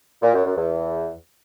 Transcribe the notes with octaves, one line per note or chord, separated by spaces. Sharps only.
A#2
F#2
F#2
E2